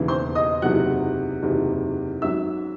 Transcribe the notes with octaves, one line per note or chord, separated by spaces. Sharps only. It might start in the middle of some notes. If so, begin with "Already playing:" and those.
Already playing: E1 D#2 C#3 E3
C5 C6
D#5 D#6
F#1 E2 C3 D#3 F#3 F#5 F#6
F#1 E2 C3 D#3 F#3
G#1 G#2 F#3 C#4 E5 E6